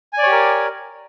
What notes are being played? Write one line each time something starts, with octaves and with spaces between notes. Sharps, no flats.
G4 A#4 C#5 D5 G#5